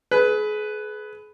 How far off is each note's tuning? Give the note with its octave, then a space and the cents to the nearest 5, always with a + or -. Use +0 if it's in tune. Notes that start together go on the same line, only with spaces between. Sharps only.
G#4 +35 B4 +5